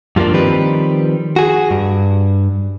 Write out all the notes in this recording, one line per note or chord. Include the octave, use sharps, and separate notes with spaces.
G2 F3 G#3 A#3 D4
D#3 F3 G3 C4 G4 B4
F#4 G#4
G2